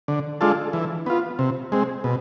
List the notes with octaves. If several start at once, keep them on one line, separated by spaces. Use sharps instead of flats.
D3
G#3 D4 F4 A4
E3
B3 F4
C3
G#3 C4
B2